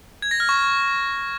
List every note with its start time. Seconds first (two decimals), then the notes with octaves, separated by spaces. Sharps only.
0.22 G#6
0.31 A#6
0.40 F6
0.49 C#6